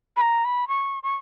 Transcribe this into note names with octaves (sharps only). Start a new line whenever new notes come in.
B5
A#5
B5
C#6
C#6